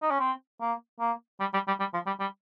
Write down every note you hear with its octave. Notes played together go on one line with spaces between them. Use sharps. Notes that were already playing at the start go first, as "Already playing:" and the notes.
D#4
C#4
C4
A#3
A#3
G3
G3
G3
G3
F3
G3
G3